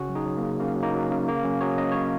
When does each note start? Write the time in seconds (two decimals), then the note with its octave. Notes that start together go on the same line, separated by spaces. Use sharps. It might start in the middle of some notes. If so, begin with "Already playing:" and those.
Already playing: C#3 C#4 F#4
0.09 F#3
0.15 D#4 G#4
0.26 F#3
0.37 A#3
0.43 C#3
0.60 C#3 A#3
0.76 F#3
0.83 A#3 D#4
0.94 F#3
1.10 C#3
1.28 C#3 A#3
1.44 F#3 C#4
1.61 F#3 G#4 C#5
1.78 C#3 D#5
1.92 C#3 C#5